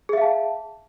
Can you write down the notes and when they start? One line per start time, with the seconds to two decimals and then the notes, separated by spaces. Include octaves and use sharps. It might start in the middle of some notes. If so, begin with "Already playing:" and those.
0.09 G#4
0.13 E5
0.17 F5
0.21 A5